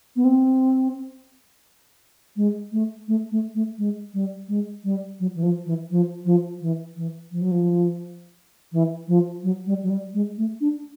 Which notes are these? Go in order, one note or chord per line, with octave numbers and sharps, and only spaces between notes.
B3
C4
G#3
A3
A3
A3
A3
G#3
G3
G#3
G3
F#3
E3
F3
E3
F3
F3
E3
E3
F3
F#3
F3
E3
F3
F#3
G3
F#3
G3
G#3
A3
D4